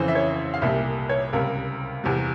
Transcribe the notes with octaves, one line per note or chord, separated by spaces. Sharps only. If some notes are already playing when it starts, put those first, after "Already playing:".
Already playing: F2 C#3 E3 C5
E5
C#5
F5
C2 A#2 G3 E5
C#5
C#2 C3 G3 A#4
E2 C3 G3